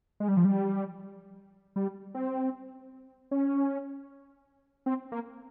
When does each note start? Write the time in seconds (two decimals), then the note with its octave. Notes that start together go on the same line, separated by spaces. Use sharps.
0.20 G#3
0.28 G3
0.37 F3
0.45 G3
1.76 G3
2.15 C4
3.31 C#4
4.86 C4
5.12 A#3